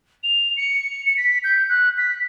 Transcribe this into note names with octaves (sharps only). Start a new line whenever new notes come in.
F7
C#7
B6
G6
F#6
B6